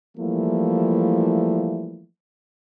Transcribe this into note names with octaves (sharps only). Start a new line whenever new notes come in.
E3 F3 G3 A3 A#3 E4